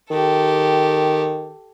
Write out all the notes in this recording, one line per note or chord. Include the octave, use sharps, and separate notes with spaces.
D#3 G4 A4